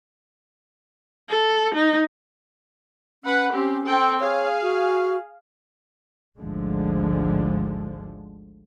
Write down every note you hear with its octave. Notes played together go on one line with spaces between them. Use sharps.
A4
D#4
C#4 B4 F#5 B5
C4 C#4 G4
C4 A4 G5
G#4 C#5 F5
F#4
G#1 D2 D3 F3 G#3